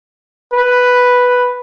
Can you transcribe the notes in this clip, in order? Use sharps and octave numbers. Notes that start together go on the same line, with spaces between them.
B4